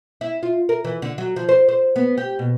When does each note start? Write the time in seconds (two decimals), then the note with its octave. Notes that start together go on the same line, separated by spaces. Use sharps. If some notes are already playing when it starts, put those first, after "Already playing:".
0.21 E4
0.43 F4
0.69 A#4
0.85 E3
1.02 D3
1.18 F#3
1.36 F3
1.49 C5
1.69 C5
1.96 B3
2.18 G4
2.39 B2